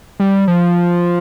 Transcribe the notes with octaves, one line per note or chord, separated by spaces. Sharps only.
G3
F3